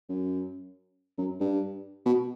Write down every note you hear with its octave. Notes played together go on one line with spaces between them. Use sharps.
F#2
F#2
G2
B2